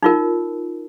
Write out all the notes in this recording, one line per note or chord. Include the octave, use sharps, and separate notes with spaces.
D#4 F4 A#4